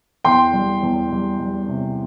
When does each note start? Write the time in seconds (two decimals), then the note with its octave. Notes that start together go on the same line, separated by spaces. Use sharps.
0.25 E2 G5 C6
0.54 G3
0.83 E2
1.12 G3
1.39 G3
1.68 C3